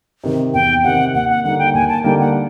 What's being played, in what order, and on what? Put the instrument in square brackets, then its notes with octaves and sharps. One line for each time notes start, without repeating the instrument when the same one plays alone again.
[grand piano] C3 D#3
[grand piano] E2 [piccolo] G5
[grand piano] C3 D#3 [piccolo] F#5
[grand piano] D#2 [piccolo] F#5
[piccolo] F#5
[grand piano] D3 G3 A#3 D#4 [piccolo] F#5
[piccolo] G5
[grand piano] D#2 [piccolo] G#5
[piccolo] A5
[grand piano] D3 G3 A#3 D#4 [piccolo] G5
[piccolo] F#5